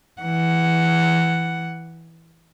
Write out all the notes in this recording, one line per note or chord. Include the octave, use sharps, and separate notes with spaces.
E3 F#5